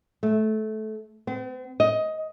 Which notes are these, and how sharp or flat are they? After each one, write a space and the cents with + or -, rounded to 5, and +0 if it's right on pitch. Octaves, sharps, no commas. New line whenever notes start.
A3 -20
C4 -45
D#5 +15